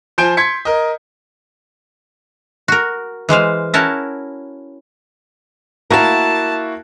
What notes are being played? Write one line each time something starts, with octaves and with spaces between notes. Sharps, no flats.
F3 C5 G#5 G6 D7
C6 G#6 B6 C#7
A#4 D#5
F#4 A#4
E3 G#3 C5 F5
C#4 E4 F#4 A#4 A5
A#3 E4 F#4 A#4 F5 A5